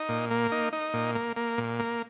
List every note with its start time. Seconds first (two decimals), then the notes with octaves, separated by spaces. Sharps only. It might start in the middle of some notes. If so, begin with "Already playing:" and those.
Already playing: D#4
0.09 A#2
0.31 A#3
0.52 D#4
0.73 D#4
0.94 A#2
1.15 A#3
1.36 A#3
1.58 A#2
1.79 A#3